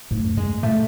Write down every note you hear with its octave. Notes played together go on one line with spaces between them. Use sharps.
G#2 A3
F#2
F#2 G#3
A2 A3